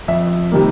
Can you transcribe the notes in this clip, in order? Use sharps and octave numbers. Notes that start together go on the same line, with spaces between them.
F2 E5
C3 D#3 G3 A#3